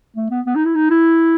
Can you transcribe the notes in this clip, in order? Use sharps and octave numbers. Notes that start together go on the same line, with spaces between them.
A3
B3
B3
D#4
E4
D#4
E4